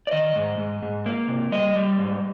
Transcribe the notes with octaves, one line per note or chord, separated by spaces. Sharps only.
D5
D#3 D#5
G#2
G#2
G#2
A#3
C3
G3 D#5
G3
G#2